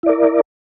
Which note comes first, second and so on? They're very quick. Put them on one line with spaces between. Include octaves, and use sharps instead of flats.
E4 D5 A#4